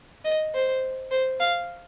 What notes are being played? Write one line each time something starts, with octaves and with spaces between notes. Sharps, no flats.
D#5
C5
C5
F5